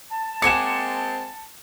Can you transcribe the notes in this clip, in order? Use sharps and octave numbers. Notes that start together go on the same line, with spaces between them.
A5
G#3 A#3 C4 F#5 G#5 D6 C#7 E7